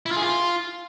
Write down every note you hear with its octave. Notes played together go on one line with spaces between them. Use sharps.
E4
F4
G#4
F4